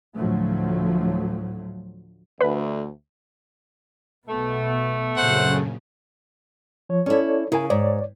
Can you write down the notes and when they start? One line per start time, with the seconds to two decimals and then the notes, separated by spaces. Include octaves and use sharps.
0.15 D2 A2 F3 F#3 A3
2.41 D2 B4 B5
4.28 B1 B2 A3 B3
5.17 A#1 F#2 C#3 C5 F#5
6.89 F3 C#5
7.06 C#4 E4 A4 C#5 D5
7.52 C#3 E4 A#4 G#5
7.70 G#2 C#5 D5